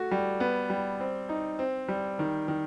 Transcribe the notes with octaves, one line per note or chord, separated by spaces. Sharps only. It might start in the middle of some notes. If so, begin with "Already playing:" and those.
Already playing: A3 F#4
G3
B3
G3
C4
D#4
C4
G3
D#3
D#3